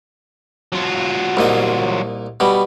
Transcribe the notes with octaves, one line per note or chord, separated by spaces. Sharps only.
F#3 F4
C2 A#2 D#5
B2 G3